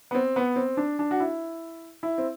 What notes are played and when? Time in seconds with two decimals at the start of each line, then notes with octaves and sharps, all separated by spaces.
0.11 B3
0.15 C4
0.36 B3
0.56 C4
0.77 D4
0.99 D4
1.11 F#4
1.20 E4
2.03 E4
2.18 C4